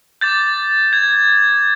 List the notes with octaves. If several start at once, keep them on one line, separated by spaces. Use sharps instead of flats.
D6 G6 A6
G#6